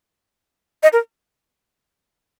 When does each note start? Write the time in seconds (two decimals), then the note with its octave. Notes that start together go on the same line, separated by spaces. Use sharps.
0.83 D#5
0.93 A#4